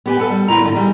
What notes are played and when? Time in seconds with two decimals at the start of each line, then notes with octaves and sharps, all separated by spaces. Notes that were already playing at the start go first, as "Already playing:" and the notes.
0.06 B3 G4 G#5
0.18 A4 B4 F#5 A5
0.30 G3
0.48 E2 E4 F4 A#5
0.64 G#2 D3
0.75 E3 G3 G#3